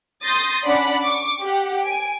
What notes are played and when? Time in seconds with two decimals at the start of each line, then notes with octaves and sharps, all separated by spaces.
0.24 C6 D#6 G6 A6 A#6
0.67 C#4 D4 D5 F#5 B5
1.04 C#6 D6
1.42 G4 F#5
1.82 G#5 D7